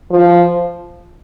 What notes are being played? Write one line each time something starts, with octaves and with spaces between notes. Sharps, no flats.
F3